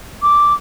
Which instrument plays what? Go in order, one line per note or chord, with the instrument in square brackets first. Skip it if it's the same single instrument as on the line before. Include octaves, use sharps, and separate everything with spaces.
[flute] D6